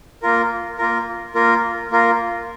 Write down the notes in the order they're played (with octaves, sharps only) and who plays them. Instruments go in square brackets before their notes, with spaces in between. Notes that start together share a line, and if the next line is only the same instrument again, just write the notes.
[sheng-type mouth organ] A#3 F4 A#4
A#3 F4 A#4
A#3 F4 A#4
A#3 F4 A#4